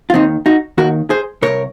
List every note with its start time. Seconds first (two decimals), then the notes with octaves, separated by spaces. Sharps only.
0.10 F4
0.14 D#2 D#3 C4 D#4
0.46 D#4 F#4
0.78 D#2 D#3 F#4 A#4
1.10 G#4 C5
1.42 C2 A#2 A#4 C#5